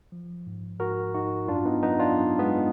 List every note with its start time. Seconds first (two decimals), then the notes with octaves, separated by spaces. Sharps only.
0.12 F3
0.47 G#2
0.80 G#2 F#4 A#4
1.14 G#2 D#4 F#4
1.48 F#2 D4 F4
1.65 B3 D#4
1.83 F#2 B3 D#4
1.99 D4 F4
2.17 F#2
2.39 G#3 B3